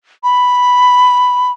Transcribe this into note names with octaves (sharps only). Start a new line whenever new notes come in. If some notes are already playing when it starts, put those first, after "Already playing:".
B5